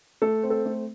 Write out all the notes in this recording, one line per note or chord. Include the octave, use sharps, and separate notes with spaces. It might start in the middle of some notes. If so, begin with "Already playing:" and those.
A3 A4
C4
A4 C5
A3